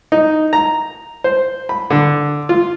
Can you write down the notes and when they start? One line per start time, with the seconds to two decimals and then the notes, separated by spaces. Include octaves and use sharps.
0.12 D#4
0.53 A#5
1.24 C5
1.69 B5
1.90 D3
2.49 F4